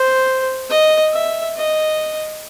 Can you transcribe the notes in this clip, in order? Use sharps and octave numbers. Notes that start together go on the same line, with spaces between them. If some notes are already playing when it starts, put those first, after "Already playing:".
Already playing: C5
D#5
E5
D#5